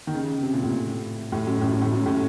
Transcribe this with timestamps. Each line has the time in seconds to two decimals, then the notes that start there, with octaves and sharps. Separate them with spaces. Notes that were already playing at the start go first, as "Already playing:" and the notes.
0.07 D#3
0.14 C#3
0.43 C3
0.53 A#2
0.63 A2
1.32 A2
1.47 F#2
1.61 A2
1.71 F#2
1.81 A2
1.92 F#2
2.06 A2